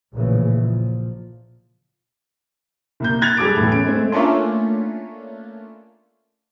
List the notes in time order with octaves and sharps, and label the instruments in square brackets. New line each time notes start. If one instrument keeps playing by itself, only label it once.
[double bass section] A#1 A2 C#3 E3
A#2 F3
[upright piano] C2 A#3 G6
F#6 G#6 A6 F7
G3 G#4 A4 D6 D7
E2 A2
C#4 D7
G#3 A3 C4
[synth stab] A3 A#3 C#4 D4 F4